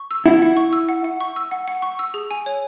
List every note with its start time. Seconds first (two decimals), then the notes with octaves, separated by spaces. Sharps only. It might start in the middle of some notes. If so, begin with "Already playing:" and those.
Already playing: C#6
0.11 E6
0.26 E4 F#5
0.42 F#5
0.57 C#6
0.73 E6
0.89 F#5
1.04 F#5
1.20 C#6
1.36 E6
1.51 F#5
1.68 F#5
1.82 C#6
1.99 E6
2.14 G#4
2.31 G#5
2.46 C#5